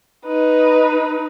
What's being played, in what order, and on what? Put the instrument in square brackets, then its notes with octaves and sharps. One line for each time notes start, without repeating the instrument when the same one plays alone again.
[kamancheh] D#4 B4